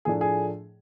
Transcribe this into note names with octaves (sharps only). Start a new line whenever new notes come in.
A2 F3 A3 D4 G#4
G#4